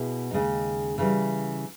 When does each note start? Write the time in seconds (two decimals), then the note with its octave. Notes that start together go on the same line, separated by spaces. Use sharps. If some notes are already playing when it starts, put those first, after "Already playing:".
Already playing: B2 B3 E4 G#4
0.31 D#2 C#3 G#3 D#4
0.98 C#3 E3 G3